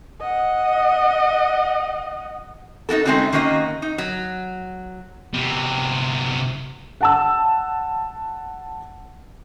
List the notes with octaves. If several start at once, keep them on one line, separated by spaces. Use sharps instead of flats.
D#5 F#5
D#4 E4 F#4 A4
G#3 A3 C4 C#4 D#4 F#4
D#3 A#3 C#4 F#4 D#5
D#4
F#3
C3 B3
F#5 A5 E6